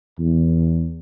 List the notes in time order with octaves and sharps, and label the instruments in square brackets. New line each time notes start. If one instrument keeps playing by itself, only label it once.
[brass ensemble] E2